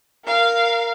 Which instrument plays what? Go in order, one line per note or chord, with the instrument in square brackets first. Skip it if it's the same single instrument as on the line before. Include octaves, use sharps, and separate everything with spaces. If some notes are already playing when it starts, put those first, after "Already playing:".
[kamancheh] A#4 F5